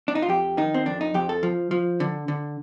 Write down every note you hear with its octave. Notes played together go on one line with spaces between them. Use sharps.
D4
D#4
F4
F2 G4
D#3 D#4
C4
F2 D4
D#4
F2 G4
A4
F3
F3
D3
D3